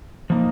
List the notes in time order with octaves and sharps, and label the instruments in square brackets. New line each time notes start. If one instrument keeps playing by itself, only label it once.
[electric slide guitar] F3 A#3 D#4